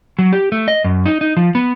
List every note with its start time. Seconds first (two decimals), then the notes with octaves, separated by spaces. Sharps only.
0.19 F#3
0.33 G4
0.52 A3
0.68 D#5
0.84 F#2
1.06 D#4
1.21 D#4
1.37 F3
1.55 B3